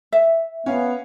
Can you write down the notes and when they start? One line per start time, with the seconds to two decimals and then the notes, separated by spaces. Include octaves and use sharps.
0.12 E5
0.66 B3 C#4 C#5 F5